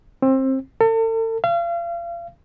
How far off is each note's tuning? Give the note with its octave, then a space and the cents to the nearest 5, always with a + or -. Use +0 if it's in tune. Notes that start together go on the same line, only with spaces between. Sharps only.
C4 +25
A4 +40
F5 -35